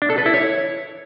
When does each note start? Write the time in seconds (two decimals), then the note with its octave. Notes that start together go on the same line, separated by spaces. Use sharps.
0.02 D4
0.10 A4
0.18 B4
0.26 E4
0.34 C#5